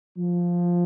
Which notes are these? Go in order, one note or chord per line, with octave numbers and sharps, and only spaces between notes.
F3